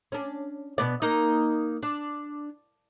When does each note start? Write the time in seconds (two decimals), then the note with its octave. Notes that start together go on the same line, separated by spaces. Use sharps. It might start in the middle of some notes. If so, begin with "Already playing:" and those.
0.12 C#4 D4
0.78 B2 B3 D5
1.02 A#3 D#4
1.83 D4